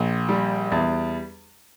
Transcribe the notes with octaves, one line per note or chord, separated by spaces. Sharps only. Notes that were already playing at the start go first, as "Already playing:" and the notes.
Already playing: A#1
G3
E2